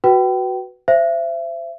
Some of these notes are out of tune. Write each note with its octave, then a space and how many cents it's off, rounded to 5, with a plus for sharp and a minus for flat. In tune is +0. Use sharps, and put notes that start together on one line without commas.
F#4 +0 B4 +0 G5 -30
C5 +0 E5 +30